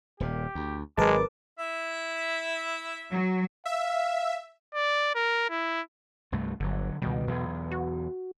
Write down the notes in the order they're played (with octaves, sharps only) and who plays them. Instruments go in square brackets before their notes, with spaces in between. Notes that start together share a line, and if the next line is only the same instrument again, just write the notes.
[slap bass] D#1 A#2 [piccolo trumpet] G4
[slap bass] D2
[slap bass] G#1 F#3 [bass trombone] G#3 [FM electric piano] A#4 B4 A5 [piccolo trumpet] D6
[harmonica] E4 E5
[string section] F#3
[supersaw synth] E5 [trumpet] F5
[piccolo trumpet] D5
A#4
E4
[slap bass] C2 G2 A3
[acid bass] G1 [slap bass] D3 F#3
[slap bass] C#2 D#3 G3 [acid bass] B2
[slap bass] B1 E2
[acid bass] F#4